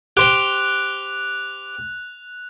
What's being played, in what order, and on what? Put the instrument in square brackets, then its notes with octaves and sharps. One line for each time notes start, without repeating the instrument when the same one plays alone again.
[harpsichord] G4 C5 G5 [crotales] F#6 F7